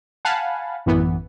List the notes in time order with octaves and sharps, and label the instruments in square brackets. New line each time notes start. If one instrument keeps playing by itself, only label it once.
[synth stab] F5 F#5 G#5 A5 B5
A1 F#2 E3 B3